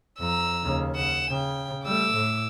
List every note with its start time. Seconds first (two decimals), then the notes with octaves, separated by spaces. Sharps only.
0.20 F2 A#5 E6
0.64 D#2 C#3
0.95 F#5 E7
1.30 C#3 G5
1.85 G3 A3 D6 E6
2.14 A2